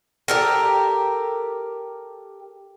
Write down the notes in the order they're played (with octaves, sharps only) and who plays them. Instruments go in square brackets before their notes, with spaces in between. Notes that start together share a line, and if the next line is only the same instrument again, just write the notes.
[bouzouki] G4 A4 A#4